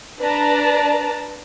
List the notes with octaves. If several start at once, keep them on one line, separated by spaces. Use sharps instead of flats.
D4 B4 D5 A5 A#5